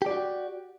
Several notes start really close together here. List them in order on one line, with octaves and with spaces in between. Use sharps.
G4 D5 F#4